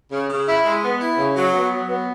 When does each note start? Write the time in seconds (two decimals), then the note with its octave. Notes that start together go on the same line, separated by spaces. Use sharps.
0.12 C#3
0.30 C#3
0.48 E4
0.65 G#3
0.83 B3
1.01 E4
1.18 C#3
1.36 F#3
1.53 B3
1.72 F#3
1.89 B3